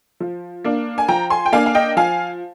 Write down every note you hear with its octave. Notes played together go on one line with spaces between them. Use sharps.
F3
A#3 D4
G#5
F3 G5 A#5
G#5 C6
G5
A#3 D4 F5 G#5
F5
D#5 G5
F3 F5 G#5